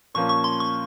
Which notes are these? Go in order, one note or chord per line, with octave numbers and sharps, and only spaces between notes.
A#2 F3 A#3 C#4 C#6
C#6
C6
C#6